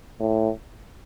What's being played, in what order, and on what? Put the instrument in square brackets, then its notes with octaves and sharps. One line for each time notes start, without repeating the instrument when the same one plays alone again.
[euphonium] A2